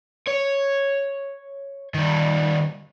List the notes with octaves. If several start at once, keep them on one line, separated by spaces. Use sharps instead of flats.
C#5
D#3 G3